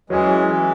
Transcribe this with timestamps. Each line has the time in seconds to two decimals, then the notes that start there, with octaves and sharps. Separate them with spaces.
0.10 E3 F#3 G#3 C#4 G#4
0.49 E3